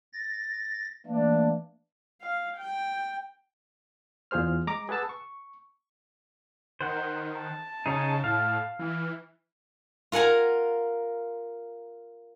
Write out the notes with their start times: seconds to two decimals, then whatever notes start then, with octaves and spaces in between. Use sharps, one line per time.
0.13 A6 A#6
1.06 E3 A3 A#3 D4
2.22 F5
2.57 G5
4.31 E2 F4 G#4 C5 F6
4.67 G#3 A#5 D6
4.89 G#4 B4 F#5 A5 E6
5.09 C#6
6.81 D#3 C5 F#5
7.38 A5
7.86 C#3 D#4 G#4 C#5
8.24 A2 F5
8.79 E3
10.12 F4 A#4 F#5 G#5 A#5